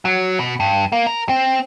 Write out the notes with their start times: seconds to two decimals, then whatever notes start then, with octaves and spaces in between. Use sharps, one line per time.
0.05 F#3
0.39 B2
0.60 G2
0.92 A#3
1.07 A#4
1.29 C4